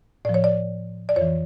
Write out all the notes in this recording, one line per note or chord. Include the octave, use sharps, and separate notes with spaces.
A2 F3 D5
C#5
D5
D5
F2 E3 C#5